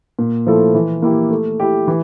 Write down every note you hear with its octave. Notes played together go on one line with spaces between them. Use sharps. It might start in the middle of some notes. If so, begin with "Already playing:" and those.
A#2
F3 A3 E4 A4
E3
A#3 E4 G4
A3
E4 G4
E3